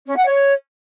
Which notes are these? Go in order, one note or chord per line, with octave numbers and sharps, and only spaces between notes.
C#4
F#5
C#5